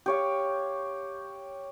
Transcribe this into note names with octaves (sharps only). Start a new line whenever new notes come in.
G4 C#5 F5